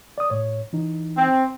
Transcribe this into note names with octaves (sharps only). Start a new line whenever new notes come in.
D5 D#6
A2 C#5
E3 D#4
C4